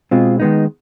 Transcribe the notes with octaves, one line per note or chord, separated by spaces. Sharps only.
B2 G#3 C4 F4
D#3 G#3 B3 D#4